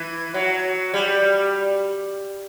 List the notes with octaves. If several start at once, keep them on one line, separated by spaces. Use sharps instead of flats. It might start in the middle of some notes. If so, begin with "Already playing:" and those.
Already playing: E3
F#3
G3